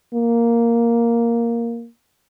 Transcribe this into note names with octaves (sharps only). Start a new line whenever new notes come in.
A#3